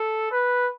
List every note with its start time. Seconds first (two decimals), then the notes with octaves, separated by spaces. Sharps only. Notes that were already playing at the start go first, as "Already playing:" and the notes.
Already playing: A4
0.32 B4